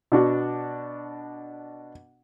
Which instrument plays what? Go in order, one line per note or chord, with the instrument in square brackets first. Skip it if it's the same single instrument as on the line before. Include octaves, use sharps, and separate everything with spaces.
[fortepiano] B2 D4 F#4